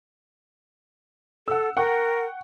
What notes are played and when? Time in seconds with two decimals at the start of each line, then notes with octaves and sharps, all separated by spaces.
1.48 A4 F#5 E6
1.77 A#4 F#5 G5 C#6